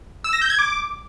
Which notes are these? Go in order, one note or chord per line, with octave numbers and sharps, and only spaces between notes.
E6
A#6
G6
G#6
D6